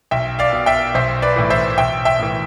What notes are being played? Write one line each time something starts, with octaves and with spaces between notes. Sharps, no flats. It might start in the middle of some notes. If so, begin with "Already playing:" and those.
B1 E5 G5
D5 F5
B2
E5 G5
B1 C5 E5
B4 D5
A2 E3
C5 E5
B1 E5 G5
E5 G5
A2 E3